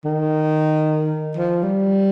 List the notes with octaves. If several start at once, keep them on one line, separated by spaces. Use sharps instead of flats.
D#3
F3
G3